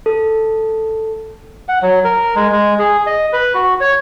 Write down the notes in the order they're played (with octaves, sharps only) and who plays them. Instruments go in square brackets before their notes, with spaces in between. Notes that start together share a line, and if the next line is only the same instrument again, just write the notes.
[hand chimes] A4
[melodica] F#5
F#3
A#4
G#3
G#3
G#4
D#5
B4
F#4
C#5